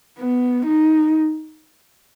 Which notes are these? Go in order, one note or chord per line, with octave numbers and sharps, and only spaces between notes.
B3
D#4